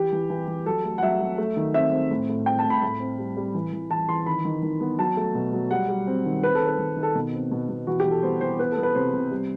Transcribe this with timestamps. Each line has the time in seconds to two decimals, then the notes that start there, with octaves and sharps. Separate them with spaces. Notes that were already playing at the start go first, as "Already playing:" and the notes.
Already playing: E3 G4
0.12 E3
0.30 E3
0.48 E3
0.66 F#3 A4
0.84 A3
0.98 F#5
1.02 F#3 E5
1.20 F#3
1.38 A3
1.57 D#3
1.74 C4 E5
1.92 C4
2.11 A2
2.29 A2
2.46 C4 G5
2.59 A5
2.65 A2
2.70 B5
2.82 A2 B5
3.00 C4
3.18 G3
3.37 G3
3.54 E3
3.73 E3
3.90 E3 A5
4.09 E3 C6
4.26 D#3 B5
4.45 D#3
4.63 D#3
4.81 B3
4.98 F#3 A5
5.17 A3
5.35 B2
5.53 F#3
5.71 G3 F#5
5.88 G3
6.07 C4
6.25 D#3
6.43 C4 B4
6.55 A4
6.61 D#3
6.67 B4
6.79 D#3
6.97 D#3
7.03 A4
7.15 B2
7.33 C4
7.51 B2
7.69 B2
7.87 E3 F#4
8.00 G4
8.05 E3
8.11 A4
8.23 B3 C5
8.41 E3 C5
8.59 B3 B4
8.72 A4
8.77 B3
8.83 B4
8.95 C3 C5
9.13 C3
9.31 G3